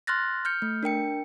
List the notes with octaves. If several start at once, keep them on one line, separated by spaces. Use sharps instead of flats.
C6 F6 F#6 A6 A#6
F6 G6 C#7
A3
D4 A#4 G5 C#7